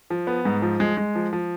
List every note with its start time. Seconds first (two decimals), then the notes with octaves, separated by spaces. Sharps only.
0.10 F3
0.27 B3
0.45 G#2
0.62 F3
0.80 G#3
0.97 G#3
1.15 F3
1.33 F3